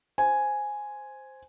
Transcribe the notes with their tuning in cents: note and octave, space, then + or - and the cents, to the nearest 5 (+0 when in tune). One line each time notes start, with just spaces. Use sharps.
C5 +0 G#5 +0